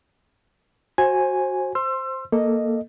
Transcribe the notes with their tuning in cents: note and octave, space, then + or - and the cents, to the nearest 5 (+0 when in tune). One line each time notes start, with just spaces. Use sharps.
F#4 +0 C5 +25 G#5 +0
C5 +0 C6 +15 E6 +30
A#3 +0 A4 +5 D#5 +0